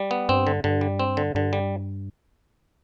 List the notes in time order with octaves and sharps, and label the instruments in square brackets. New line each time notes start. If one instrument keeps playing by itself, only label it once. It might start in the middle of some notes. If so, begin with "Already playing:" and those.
Already playing: [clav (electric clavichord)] G3
B3
[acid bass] G2 [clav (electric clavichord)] C4
[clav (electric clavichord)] D3
[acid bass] G2 [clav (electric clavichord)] D3
[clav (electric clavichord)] G3
C4
D3
[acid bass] G2 [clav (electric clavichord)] D3
[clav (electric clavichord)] G3